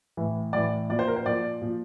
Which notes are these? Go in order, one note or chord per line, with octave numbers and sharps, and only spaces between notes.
A2 E3
A2 E3 D5
A#2 F3 D5
C5
A#4
C5
A#2 F3 D5
A#2 F3